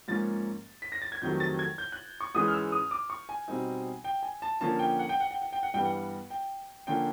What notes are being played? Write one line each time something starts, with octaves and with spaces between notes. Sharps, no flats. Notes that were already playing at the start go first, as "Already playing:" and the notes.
G#2 F3 A#3 C#4 A6
B6
A#6
A6
G#6
F2 C3 D#3 F#3 A3 G6
A6
G#6
G6
F#6
C#6
G#2 E3 G#3 C#4 D#6
F6
E6
D#6
D6
C#6
G#5
B2 G3 C4 D#4
G5
G#5
A5
D3 F3 A#3 C#4 A5
G5
F#5
G5
F#5
G5
F#5
G5
F#5
G2 E3 G3 B3 G5
F#5
G5
D3 F3 A#3 C#4 G5